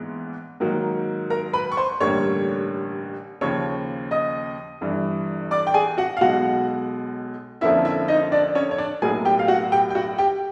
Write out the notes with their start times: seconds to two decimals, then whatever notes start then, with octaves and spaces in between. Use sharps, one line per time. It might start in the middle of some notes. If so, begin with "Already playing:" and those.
Already playing: A#1 G#2 E3 G#3 B3
0.60 G#2 D#3 F#3 A#3
1.30 A#4 A#5
1.53 B4 B5
1.72 C#6
1.77 C5 C6
2.00 A1 G2 D3 G3 A#3 C#5 C#6
3.41 D#2 C#3 F3 C#5 C#6
4.11 D#5 D#6
4.81 G1 G2 E3
5.51 D5 D6
5.67 G5
5.74 G#4 G#5
5.98 F#4 F#5
6.17 F5
6.21 B1 B2 G#3 F#4 F#5
7.61 F2 D3 F3 A#3 C#4 E4 E5
7.85 E4 E5
8.08 D#4 D#5
8.32 D4 D5
8.55 C#4 C#5
8.71 C#5
8.78 D4 D5
9.02 B1 A2 F#3 A#3 G#4 G#5
9.25 G4 G5
9.39 F5
9.48 F#4 F#5
9.72 G4 G5
9.90 G5
9.95 F#4 F#5
10.18 G4 G5